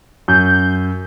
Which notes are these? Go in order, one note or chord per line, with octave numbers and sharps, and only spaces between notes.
F#2 G6